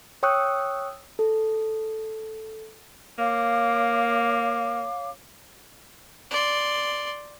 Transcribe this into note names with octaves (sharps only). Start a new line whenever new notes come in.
C#5 G5 C#6 D#6 E6 F#6
A4
A#3 C#5 F5 D6
D5 C6